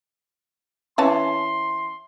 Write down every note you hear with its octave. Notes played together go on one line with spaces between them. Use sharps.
E3 C#4 A5 C6